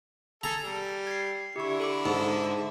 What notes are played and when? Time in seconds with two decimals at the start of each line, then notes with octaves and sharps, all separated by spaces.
0.44 G#4 A4 A#5
0.62 G3
1.07 G#6 C7
1.56 D3 E4 G4 C#6
1.80 A4 B5 D6
2.06 G#2 D#4 A5